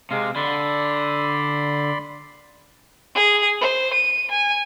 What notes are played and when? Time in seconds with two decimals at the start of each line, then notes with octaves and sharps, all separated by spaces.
0.11 C3 G#3 F5
0.36 D3 D5 B5 C6
3.15 G#4
3.61 C5
3.94 D#7
4.31 G#5